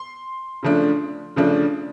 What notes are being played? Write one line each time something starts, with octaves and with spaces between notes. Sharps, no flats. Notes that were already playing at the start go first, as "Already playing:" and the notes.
Already playing: C6
C#3 F3 A3 D4
C#3 F3 A3 D4